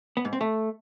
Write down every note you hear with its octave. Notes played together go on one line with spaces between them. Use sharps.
B3
G#2
C4
A3